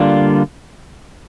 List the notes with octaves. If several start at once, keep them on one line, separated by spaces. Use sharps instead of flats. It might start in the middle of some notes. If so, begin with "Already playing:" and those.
Already playing: D3 G3 A#3 D4 F4